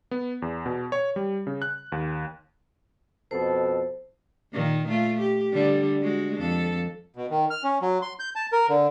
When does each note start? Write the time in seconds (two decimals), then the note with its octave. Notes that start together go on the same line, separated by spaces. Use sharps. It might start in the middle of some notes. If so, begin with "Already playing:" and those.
0.11 B3
0.42 E2
0.66 B2
0.92 C#5
1.16 G3
1.47 C#3
1.62 F#6
1.92 D#2
3.31 F2 B2 A4 C5
4.53 A#2 D#3 A#3
4.88 A3 F4
5.20 G4
5.52 D3 G3
6.02 G#3 F#4
6.37 F2 A4
7.16 B2
7.30 D#3
7.50 F6
7.64 C#4
7.82 F#3
8.02 C6
8.19 G6
8.36 A5
8.53 A#4
8.69 D3